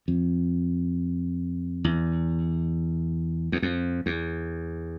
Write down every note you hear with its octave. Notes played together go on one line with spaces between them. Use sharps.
F2
E2
E2
F2
E2